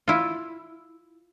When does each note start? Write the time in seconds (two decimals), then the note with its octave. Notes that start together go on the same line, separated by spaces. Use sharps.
0.08 E4 F4